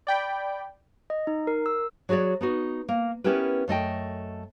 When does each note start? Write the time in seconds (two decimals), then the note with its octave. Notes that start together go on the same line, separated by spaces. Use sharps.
0.07 D5 G5 B5
1.10 D#5
1.27 D#4
1.47 A#4
1.66 E6
2.09 F#3 F#4 G#4 C#5 D5
2.41 B3 D#4 F#4
2.89 A#3
3.24 B3 C#4 E4 G4 A#4 B4
3.68 F#2 A3 D#5 G5